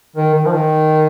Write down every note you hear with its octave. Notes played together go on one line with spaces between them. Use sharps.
D#3
D#3
F3
D#3